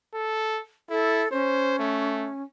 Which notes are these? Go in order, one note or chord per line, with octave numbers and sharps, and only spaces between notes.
A4
E4 A4
C#4 C5
A3